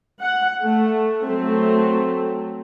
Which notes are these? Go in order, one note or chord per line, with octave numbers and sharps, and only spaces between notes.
F#5
A3
F#3 A3 C4